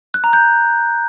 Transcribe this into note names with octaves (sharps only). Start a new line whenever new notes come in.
F#6
A#5
G6